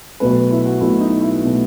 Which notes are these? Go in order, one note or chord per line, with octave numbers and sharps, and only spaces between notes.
B1 B2 A3 B4
E4
F#4
B1 B2 A3 E4
D#4
E4
B2 A3